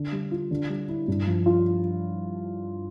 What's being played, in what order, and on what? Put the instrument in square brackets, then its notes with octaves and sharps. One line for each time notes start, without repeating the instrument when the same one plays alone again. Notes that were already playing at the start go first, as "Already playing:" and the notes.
Already playing: [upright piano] D3
G3
F4
D3
G3
E4
G2
F3
F4